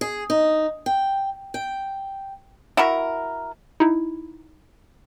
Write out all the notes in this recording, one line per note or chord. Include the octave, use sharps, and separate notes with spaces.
G#4
D#4
G5
G5
E4 F#4 A#4
D#4 E4